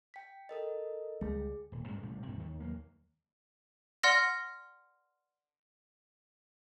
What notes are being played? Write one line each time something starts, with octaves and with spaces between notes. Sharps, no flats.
G5 B6
A4 A#4 D#5
C#2 G3 G#3 G#4
D#1
G2 G3 G#3 C#4
A1 A2 C3 G3
G#2 C3 G3
D#2 D#3
D#2 F#3 A#3
D5 F#5 C6 F6 A#6